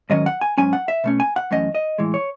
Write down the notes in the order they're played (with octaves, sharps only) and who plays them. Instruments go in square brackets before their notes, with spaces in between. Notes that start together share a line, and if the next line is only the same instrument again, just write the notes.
[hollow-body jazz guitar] G#2 D#3 F#3 C#4 D#5
F#5
G#5
G#2 F#3 C#4 G#5
F#5
E5
B2 A3 C#4
G#5
F#5
F#2 E3 A3 C#4 D#5
D#5
A2 E3 G#3
C#5